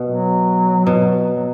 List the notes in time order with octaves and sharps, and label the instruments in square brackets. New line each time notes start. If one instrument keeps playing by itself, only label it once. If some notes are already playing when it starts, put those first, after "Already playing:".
Already playing: [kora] B2
[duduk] F#3
[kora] B2
[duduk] F#3